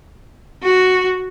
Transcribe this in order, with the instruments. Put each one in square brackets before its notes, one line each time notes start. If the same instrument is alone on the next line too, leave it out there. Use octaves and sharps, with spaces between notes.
[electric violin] F#4